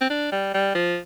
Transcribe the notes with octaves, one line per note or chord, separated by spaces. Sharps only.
C4
D4
G3
G3
F3